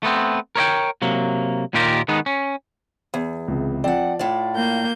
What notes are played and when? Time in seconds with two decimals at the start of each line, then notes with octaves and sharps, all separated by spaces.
0.03 A3 B3 C4
0.56 A#4 C#5 D#5 G5
1.02 C3 F#3 A#3
1.73 D#2 A#2 D#3 F4 G4 A#4
2.08 D#3 G#3 B3 D#4
2.26 C#4
3.14 E2
3.48 C#2 C3
3.84 F3 C4 D5 F#5
4.19 A2 F4 D5
4.55 A#3 G6